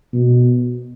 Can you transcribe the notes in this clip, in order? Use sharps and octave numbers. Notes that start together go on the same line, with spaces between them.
B2